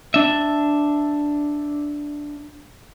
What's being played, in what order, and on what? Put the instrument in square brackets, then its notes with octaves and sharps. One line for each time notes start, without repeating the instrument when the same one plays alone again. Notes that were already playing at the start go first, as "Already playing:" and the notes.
[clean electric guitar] D4 E5